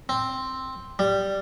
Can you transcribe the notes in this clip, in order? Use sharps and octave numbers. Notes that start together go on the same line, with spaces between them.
C4
G3